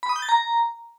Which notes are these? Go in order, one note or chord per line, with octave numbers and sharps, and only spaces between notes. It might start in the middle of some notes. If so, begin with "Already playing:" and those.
B5
D#6
G6
A6
A#5